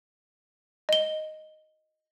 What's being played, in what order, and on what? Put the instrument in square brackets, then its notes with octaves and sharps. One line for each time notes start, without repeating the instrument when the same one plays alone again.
[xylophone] D#5 G7